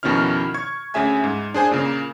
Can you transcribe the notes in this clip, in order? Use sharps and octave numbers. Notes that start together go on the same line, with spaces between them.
F2 B2 D#3 C#4 E4 F6
C#6 G#6
D2 C#4 G#4 E5 G#5 G#6
G#2
D4 G#4 C5 G#5
A#2 C#3 A#3